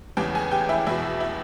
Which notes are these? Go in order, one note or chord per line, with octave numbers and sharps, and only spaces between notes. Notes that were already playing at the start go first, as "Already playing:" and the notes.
E2 C#3 E3 G4 G5
G#4 G#5
G4 G5
E4 E5
E2 B2 E4 E5
E4 E5